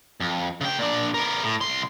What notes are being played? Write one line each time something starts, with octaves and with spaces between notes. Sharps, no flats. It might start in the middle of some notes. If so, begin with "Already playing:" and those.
F2
C#3 G5
A#2 D4
B3 A#4
A2
C2 C6